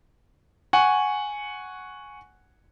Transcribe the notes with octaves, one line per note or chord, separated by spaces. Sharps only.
F#5 G#5 C#6